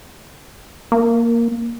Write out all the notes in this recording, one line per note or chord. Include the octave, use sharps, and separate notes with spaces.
A#3